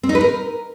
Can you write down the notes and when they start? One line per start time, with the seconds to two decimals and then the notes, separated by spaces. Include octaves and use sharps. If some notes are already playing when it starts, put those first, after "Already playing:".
0.03 C4
0.09 D#4
0.15 B4
0.21 A#4